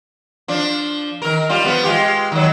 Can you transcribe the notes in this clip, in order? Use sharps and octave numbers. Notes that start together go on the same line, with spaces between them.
F3 D4
D#3 A#4
G3 F4
F3 B3
G#3 F4 G4
D#3 F#3